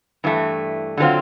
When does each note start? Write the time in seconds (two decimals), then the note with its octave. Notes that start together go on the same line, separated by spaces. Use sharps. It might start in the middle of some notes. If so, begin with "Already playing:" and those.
0.24 G2 E3 A3
0.98 D3 F#3 A3 C4 F4